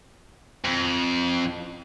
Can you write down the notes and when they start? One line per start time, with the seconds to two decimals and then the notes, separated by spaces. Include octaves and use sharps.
0.65 F2